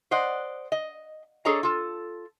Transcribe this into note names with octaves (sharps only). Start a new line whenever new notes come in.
C5 D5 D#5 F#5
D#5
D4 G#4 A4 C#5 D#5 A#5
F4 A4